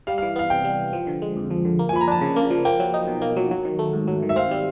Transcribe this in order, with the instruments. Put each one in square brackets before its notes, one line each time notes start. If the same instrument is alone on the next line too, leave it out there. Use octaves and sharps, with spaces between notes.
[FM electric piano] G3 [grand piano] F5
[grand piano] F5
[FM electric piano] E3
[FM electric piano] B3 [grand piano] F5
[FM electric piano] C3 [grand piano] G5
[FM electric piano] G3
E3
F3
D3
G#3
F2
F3
D3
A#3
[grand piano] G#5
[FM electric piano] F3 [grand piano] B5
[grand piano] A#5
[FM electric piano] D4 [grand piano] A5
[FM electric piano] C#3
A#3
F3
[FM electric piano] A#3 [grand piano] G5
[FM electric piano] F#3
D#4
B2
A#3
F#3
F#3
D#3
A3
G#2
F#3
D#3
[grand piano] E5
[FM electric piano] C4 [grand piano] F5
[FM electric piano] G3